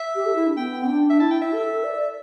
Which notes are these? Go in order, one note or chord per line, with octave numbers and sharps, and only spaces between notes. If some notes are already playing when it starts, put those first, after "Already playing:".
Already playing: E5
G4
A4
E4
D4
B3 G5
D4 G5
E5
E4 A5
G5
E5
A4
D5